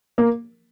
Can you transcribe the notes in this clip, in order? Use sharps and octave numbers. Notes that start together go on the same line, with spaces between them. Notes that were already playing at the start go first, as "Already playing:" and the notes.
A#3